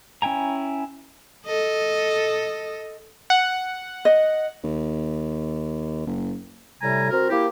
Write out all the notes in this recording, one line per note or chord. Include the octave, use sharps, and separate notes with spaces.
C#4 E4 G5 G#5 A#5
A4 D#5
F#5
D#5
D#2
F#1
A2 C3 G3 G#5 A#5
C4 F#4 A#4
A#3 E4 G4